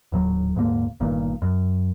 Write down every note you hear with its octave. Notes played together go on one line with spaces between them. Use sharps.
D#1 A2 F#3
D#1 G#2 D3 A#3
G1 G2 A#2 D#3
F#2